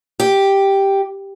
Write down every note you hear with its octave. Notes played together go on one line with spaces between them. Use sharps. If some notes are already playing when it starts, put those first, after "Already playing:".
G4